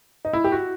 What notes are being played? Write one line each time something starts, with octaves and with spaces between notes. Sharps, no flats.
D#4
E4
G4
F#4